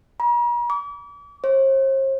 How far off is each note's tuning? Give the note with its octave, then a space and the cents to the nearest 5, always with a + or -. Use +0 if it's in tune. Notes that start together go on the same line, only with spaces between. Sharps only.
A#5 +45
D6 -40
C5 +45